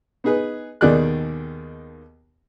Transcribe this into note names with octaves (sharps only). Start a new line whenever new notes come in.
B3 D#4 G#4 B4
D#2 B2 D#3 G#4 D5 F#6